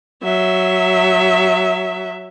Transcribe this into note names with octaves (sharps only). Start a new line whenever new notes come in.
F#3 E5